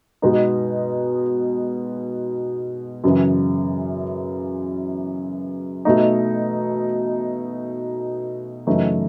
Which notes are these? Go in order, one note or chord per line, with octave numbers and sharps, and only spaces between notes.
B2 G#3 B3 D#4
F#2 C#3 E3
B2 A3 D#4
F#2 C#3 E3 A3 D#4